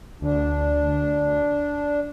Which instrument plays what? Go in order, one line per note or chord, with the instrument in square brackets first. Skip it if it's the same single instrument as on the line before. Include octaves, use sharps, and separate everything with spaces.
[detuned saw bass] D2 [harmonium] D4